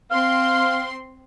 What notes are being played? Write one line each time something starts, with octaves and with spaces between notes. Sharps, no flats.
C4 F5 C6